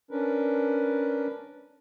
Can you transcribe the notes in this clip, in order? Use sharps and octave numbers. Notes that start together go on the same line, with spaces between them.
C#4 D4 A#4 B4